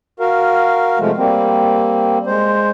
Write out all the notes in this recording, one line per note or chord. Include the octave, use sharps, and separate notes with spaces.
F#4 A#4 F5
C3 F3 G#3 A3
G3 A#3 C4
G#3 C5